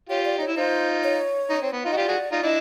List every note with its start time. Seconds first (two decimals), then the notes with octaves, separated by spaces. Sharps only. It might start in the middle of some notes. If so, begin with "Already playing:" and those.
0.09 F4 G4 C#5
0.25 D5
0.38 D#4 C#5
0.47 E4
0.56 D#4 F4 C5
1.04 C#5
1.50 C#4 D#4
1.62 C4
1.73 B3
1.85 D#4 F4
1.91 F#4 D#5
1.97 F4 G4 D5
2.08 F#4 G#4
2.32 D#4 F4
2.43 D4 E4 D#5